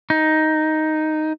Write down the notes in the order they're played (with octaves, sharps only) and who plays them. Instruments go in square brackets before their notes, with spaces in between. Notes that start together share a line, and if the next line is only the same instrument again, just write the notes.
[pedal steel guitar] D#4